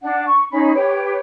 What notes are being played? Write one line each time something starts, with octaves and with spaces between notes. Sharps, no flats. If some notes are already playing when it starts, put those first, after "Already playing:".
D4 F#5
C#6
C#4 D#4 B5
G4 B4 C#5